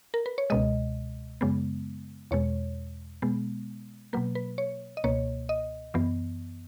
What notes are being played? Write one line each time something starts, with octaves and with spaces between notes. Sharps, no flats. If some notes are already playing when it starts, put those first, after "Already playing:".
A#4
B4
C#5
C#2 B2 G#3 D#5
F#2 C#3 G#3 B3
E2 B2 G#3 C#5
B2 G#3 B3
B2 F#3 A#3 B4
B4
C#5
D#5
C#2 B2 A#3 C#5
D#5
F#2 E3 B3